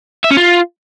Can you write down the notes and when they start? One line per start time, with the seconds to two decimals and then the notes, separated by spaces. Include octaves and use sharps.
0.24 E5
0.31 C#4
0.37 F4